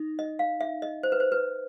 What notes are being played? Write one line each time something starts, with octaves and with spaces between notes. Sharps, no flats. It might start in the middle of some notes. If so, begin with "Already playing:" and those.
Already playing: D#4
D#5
F5
E5
D#5
C5
B4
C5
B4